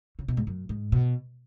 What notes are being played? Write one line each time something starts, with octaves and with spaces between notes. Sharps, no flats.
C#3
B2
G#2
F#2
G#2
B2